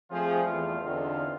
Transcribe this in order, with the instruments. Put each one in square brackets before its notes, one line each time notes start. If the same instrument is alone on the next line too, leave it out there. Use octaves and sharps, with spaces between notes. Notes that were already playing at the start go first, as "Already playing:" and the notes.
[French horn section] F3 C4 G#4 [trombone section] G3 A3 F4
[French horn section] E2
[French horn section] E2 D3 [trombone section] C4 D#4 F4